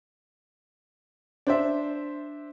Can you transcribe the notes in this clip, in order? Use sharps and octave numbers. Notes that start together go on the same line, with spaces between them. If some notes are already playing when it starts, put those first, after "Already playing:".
D4 C5 E5